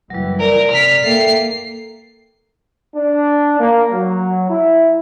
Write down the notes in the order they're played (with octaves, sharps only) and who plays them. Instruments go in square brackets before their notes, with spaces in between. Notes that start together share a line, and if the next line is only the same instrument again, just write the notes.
[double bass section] F#1 E3 [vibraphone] F#3 G3
[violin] A#4 [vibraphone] D5
[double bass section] C3 [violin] F6 B6
[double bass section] A#3 [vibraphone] A4 E5 G5 [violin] C7
[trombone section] D4
A#3
F#3
E4